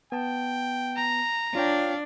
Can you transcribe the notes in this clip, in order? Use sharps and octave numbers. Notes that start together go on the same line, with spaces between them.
B3 G5 A5
A#5
D4 F4 C#5 F5 G5